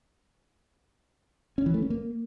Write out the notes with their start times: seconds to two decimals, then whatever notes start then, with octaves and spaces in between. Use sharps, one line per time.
1.58 C#4
1.66 E3
1.74 A3
1.82 C#4
1.90 A#3